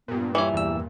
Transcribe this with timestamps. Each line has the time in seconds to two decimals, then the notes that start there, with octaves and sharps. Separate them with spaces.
0.08 G2 A#2 B3
0.35 E3 G3 G4 C#5
0.54 E2 E6